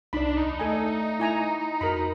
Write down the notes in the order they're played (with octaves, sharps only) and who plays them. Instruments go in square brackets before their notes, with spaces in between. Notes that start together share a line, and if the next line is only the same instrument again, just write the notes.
[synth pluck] C2 D#4 E7 [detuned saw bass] D4 [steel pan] D5 B5
[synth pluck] D#2 [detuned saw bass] D#4
[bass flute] A3 [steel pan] A4 G#5
[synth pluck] D5
[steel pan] E4 G#5 A#5
[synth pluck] F2 [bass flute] F#4 [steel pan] A#4 A#5 B5